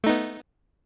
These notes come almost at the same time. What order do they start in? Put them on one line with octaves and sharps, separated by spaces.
A3 D#4 B3